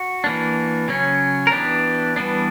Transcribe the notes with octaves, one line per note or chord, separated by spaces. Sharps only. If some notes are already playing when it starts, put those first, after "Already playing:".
Already playing: F#4
E3 A#3 D4
C#3 F#3 C#4
A#4
E3 B3 D4 G4
E3 G3 B3 D4